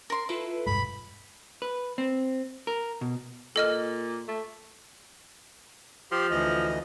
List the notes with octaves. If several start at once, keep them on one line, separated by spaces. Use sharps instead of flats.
A#4 C6
E4 F4 A4 B4
E1 G2 G#3 B5
B4
C4
A#4
B2
A#2 A4 D#5 F6
A3
F3 G4 C6
D2 E3 D#5